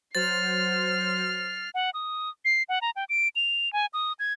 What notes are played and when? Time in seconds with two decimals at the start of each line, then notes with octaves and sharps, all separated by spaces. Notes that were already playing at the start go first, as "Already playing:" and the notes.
0.15 F#3 C5 F6 A6 C7
1.74 F#5
1.94 D#6
2.45 C7
2.69 F#5
2.82 A#5
2.96 G5
3.09 D7
3.36 F7
3.73 G#5
3.93 D#6
4.19 G#6